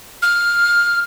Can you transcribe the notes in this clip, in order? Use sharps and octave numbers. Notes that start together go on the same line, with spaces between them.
F6